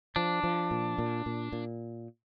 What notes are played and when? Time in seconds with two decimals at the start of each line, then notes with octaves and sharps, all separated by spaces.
0.16 F3 D4
0.44 F3
0.71 A#2
0.98 A#2
1.26 A#2
1.52 A#2